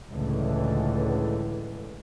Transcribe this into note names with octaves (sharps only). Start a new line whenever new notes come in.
C#2 A2 D3 E3